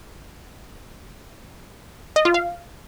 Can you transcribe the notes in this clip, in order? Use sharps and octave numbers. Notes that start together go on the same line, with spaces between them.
D#5
F4
F5